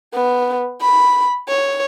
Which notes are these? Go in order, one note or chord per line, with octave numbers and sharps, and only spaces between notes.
B3
B5
C#5